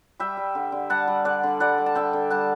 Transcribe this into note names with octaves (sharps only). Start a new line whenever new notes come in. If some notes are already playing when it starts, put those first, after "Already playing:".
G3 E5 G5
G3
D3
D3
G3 F#5 A5
G3
D3 D5 F#5
D3
G3 D5 F#5
G3
A5
D3 E5 G5
D3
G3 F#5 A5